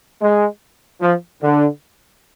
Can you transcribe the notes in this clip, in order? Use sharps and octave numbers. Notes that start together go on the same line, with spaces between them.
G#3
F3
D3